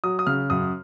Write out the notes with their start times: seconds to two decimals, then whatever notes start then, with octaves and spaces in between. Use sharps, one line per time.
0.04 F#3 D#6
0.19 D#6
0.27 C#3 F6
0.50 F#2 D#6